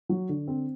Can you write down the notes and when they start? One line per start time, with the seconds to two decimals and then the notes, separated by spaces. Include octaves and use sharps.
0.09 F#3
0.29 D3
0.48 C4